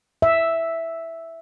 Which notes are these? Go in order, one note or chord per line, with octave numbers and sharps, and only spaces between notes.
E5